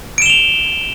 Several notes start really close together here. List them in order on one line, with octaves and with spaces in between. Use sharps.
D7 E7 G7 F7